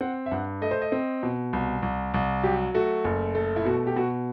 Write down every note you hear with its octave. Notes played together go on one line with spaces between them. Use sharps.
C4 F#5
E5
G2 F#5
A3 D#5
C5
D#5
C4
B2
C2
C2
C2
F#3 G4
A3 F#4
F#1
A3
E4
B2 F#4
G4
B2 F#4